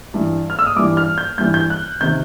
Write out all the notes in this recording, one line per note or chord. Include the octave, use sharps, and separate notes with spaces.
G2 E3 G3
F6
E6
D#6
G2 E3 G3 D6
F6
G6
G2 E3 G3 G6
G6
F#6
C3 D#3 G6